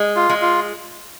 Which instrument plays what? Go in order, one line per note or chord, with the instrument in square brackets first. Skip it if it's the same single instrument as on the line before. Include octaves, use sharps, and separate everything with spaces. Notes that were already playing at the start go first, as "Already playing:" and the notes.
Already playing: [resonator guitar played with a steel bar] G#3
[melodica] F4
[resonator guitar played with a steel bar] G#3
[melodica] F4